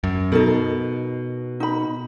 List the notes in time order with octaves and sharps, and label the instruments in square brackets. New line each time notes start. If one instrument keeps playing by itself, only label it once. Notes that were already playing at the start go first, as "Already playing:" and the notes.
[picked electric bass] F#2
[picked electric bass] B2 [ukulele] D#4 A4 A#4
[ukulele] D#4 B5